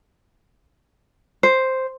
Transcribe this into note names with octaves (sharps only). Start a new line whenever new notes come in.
C5